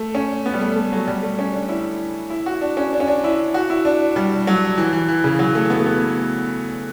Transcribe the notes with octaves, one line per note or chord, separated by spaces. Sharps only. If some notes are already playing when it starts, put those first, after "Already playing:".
Already playing: A3
C#4
B3
G3
A3
A3
F#3
G3
A3
C#4
D4
E4
E4
F#4
D4
C#4
D4
C#4
D4
E4
F#4
E4
D4
G3
F#3
E3
E3
E3
C#3
F#3
A3
B3
A3
B3